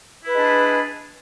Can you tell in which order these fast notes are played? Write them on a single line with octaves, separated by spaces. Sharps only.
E4 B4 G#3 D4 G#4